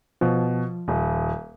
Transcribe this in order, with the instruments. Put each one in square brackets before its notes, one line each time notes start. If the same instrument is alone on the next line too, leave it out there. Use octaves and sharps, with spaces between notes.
[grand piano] B2 [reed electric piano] F3
[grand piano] D#1